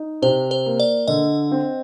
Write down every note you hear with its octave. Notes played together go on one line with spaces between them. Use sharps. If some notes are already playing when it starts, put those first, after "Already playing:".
Already playing: D#4
C3 C5
C5
A#3
D5
D3 D#5
C4